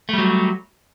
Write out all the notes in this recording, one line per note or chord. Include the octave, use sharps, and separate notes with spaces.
F#3 G3 A3